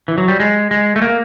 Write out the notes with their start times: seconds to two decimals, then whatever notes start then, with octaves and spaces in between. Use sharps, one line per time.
0.08 E3
0.18 F#3
0.28 G3
0.40 G#3
0.71 G#3
0.96 A3
1.02 A#3